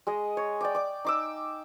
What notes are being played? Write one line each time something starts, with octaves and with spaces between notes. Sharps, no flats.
G#3 G#4 D#5
C#5
D5 G5 D6
D5 D6
D#4 D6 E6